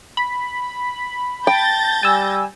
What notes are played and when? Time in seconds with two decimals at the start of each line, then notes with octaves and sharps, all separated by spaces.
0.17 B5
1.47 G5 A5 G6 A6 A#6
2.03 G3 G#5 E6